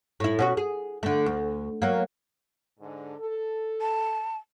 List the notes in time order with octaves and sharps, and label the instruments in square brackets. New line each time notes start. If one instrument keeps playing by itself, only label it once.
[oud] A2 E4
B2 C#4 F#4
G#4
D3 A3
D2
F#3 A#3
[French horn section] G#2 D3
A4
[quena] A5